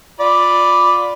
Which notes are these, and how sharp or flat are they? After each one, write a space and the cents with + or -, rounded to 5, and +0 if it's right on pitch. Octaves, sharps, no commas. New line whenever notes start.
F4 +20 D5 +0 B5 +0